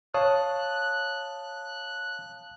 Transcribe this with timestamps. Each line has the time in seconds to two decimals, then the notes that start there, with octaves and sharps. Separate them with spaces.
0.14 C#5 F5 A5 D#6 F#6